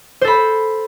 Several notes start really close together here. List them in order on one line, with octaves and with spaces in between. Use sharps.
C5 A4 B5